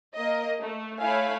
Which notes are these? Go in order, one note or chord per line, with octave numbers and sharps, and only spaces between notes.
A#3 D#5
A3
A3 E4 C#5 F5 G#5 B5